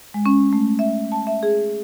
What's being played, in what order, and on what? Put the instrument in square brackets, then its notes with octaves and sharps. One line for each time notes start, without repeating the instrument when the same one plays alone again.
[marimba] G#3
C#4
A3
E5
A5
E5
G#4